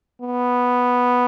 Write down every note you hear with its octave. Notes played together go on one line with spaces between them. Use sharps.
B3